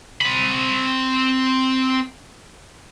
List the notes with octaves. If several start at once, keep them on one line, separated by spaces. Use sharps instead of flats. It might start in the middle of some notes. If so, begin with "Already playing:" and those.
C4 B5